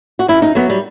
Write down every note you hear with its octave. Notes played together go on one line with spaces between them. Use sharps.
F#4
F#2 E4
D#4
F#3 B3
G3